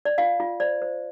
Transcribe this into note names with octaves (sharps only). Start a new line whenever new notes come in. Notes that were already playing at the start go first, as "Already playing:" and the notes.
D5
F4 F5
F4
C5 D5
C5